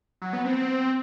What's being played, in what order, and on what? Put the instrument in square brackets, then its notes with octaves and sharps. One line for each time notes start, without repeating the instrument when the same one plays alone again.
[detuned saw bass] F#3
B3
C4